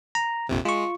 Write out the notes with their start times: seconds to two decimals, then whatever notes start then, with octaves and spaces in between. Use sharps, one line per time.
0.15 A#5
0.49 A#1 F2 C3
0.65 G#3 F4 C#6